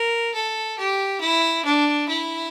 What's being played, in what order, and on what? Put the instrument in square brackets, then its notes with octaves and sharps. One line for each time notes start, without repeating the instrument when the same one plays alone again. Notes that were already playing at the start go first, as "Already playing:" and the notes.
Already playing: [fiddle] A#4
A4
G4
E4
D4
E4